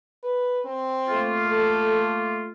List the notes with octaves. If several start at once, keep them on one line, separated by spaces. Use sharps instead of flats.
B4
C4
A3 A#3 F4
A4